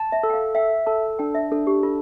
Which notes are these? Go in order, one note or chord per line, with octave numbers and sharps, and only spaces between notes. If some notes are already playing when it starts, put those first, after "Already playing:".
Already playing: A5
E5
A4
G5
F5
E5 G5
A4 A5
D4 G5
E5
D4 A4
G4
F4 A4